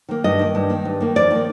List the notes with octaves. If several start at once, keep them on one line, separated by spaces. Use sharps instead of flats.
D#3 A#3
G2 D#5
D#3 A#3
G2
D#3 A#3
G2
D#3 A#3
F2 D5
D#3 A#3